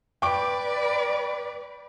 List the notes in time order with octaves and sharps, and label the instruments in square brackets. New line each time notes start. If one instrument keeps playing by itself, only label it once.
[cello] B4 D5 [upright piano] G5 D6 D7